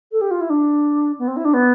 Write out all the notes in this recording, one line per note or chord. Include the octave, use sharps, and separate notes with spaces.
A4
G4
F4
E4
D4
B3
C4
E4
D4
B3